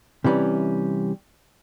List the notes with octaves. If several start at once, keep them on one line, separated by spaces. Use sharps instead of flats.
C3 E3 G3 C#4